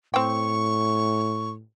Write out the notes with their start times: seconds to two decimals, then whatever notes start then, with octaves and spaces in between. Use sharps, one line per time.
0.14 A2 C4 G5 C#6